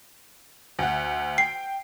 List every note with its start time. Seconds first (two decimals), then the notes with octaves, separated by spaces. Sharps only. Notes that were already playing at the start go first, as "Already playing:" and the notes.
0.79 D2 F#5
1.38 G5 C7